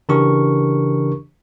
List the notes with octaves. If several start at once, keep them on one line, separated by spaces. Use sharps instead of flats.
C#3 E3 D4 G4 A#4 C#6